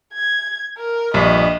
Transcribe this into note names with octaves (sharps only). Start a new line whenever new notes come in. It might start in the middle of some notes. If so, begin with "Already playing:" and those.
G#6
A#4
A#1 G2 D#5